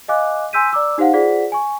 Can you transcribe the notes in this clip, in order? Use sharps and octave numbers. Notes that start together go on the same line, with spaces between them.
D#5 F5 G#5 D6 F#6
G#5 C6 E6 G6 B6 D#7
D5 A#5 D6 E6
D#4 G4 C5 F5 F#5
F4 G#4 C5 D5 F#5 B6
G#5 C#6